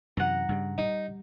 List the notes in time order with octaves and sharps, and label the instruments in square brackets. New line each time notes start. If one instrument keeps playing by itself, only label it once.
[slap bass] F#2 C3 E3 [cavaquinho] F#5 A#5
[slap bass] G2 C#3 G3
[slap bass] G3 [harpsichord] D#4